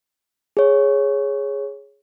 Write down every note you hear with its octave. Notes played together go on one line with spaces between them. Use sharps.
G#4 C#5